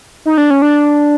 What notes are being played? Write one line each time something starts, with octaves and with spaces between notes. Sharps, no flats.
D#4
D4
C#4
D4